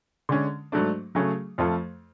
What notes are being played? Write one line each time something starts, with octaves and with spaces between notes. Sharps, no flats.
D3 G#3 C#4
G#2 F#3 A3 D4
C#3 F#3 A3 C#4 G#4
F2 F3 A3 F4 A4